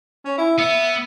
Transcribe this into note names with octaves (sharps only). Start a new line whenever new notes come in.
C#4
E4
B3 E5